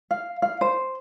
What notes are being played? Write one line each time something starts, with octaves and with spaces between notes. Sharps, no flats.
F5
F5
C5